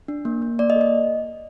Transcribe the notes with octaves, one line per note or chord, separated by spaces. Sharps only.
D4
A#3
A#3
A#3 D5
D#5
A4
D#5